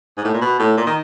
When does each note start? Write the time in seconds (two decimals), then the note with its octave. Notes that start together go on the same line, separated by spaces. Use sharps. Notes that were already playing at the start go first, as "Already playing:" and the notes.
0.17 G#2
0.25 A2
0.34 A#2
0.41 B2
0.59 A2
0.77 A#2
0.86 D#3